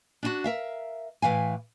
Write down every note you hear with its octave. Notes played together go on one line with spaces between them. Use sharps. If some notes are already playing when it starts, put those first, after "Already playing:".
D4 D#4 F#4
A#4 E5 F5
A2 E3 F5 G#5